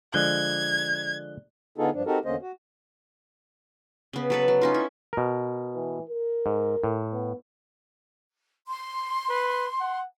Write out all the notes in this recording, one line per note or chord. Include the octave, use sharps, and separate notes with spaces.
D3 F3 G#3 D5 F#6 G#6 G7
D3 B3 D#4 F4 G#4 A4
G2 F3 D4
C4 D#4 F#4 G4 A4 A#4
E2 D3 A#3 C#4 C5 D#5
F#4
C#3 B3
F#3 A4 B4
F#3
C#4 D#4 F4
E4
B2 A#4
E3
A#4
G#2
A2
B3
C6
B4
F#5